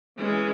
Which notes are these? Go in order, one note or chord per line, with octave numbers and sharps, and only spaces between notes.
E3 G#3 C#4